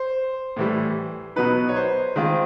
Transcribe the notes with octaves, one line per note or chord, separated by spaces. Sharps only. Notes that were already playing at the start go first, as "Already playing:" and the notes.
Already playing: C5
A2 E3 G3
B2 F#3 B3 D#4 B4
C#5
C5
D#3 G#3 C4 F4